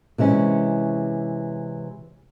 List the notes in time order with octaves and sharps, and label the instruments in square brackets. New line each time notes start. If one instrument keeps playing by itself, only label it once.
[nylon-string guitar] C3 E3 G#3 C#4